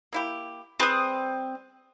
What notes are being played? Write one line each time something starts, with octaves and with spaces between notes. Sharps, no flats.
A#3 E4 G4
G3 C4 G#4 B4 D#6